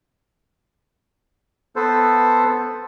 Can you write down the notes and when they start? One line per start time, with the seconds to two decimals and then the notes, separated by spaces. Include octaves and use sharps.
1.76 B3 A4 B4 C5